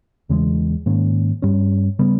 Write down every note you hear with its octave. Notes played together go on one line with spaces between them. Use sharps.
E2 C#3 E3 G#3
G#2 D#3 A#3 C#4
G2 G3 C#4
C#3 G3 B3